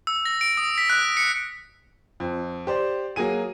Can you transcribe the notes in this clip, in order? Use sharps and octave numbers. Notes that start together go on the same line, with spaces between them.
E6
A#6
D7
D#6
B6
F#6
C#7
F2
G4 C5 D5
F#3 A#3 G#4 G#5 D#7